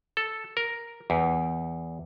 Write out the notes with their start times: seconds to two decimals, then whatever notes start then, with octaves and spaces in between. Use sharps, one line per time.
0.17 A4
0.57 A#4
1.10 E2